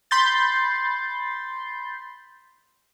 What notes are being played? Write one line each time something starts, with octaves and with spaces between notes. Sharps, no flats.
B5 C6 G6 A6